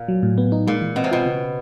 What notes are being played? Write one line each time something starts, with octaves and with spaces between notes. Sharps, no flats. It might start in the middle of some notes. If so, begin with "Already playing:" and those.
Already playing: A#2
F#3
A2
B3
D#4
A#2 G#3
E3
B2 C4
C3
B2 F4
C#3